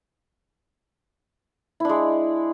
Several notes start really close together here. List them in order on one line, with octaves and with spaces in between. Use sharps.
E4 D4 G#3